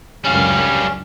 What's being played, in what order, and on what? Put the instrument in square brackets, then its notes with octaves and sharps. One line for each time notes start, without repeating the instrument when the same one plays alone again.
[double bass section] C#2 F#2 D3 [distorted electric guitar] G3 F5 [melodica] C#4